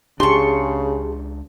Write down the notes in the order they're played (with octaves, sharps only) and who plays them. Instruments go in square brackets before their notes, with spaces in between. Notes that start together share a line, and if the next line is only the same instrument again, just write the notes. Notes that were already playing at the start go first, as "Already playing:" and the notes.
[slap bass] C#2 D4 [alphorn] C#3 [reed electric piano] G4 G#4 A5 [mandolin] C6 C#6